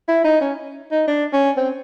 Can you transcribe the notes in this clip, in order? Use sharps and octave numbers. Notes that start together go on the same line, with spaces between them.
E4
D#4
C#4
D#4
D4
C#4
C4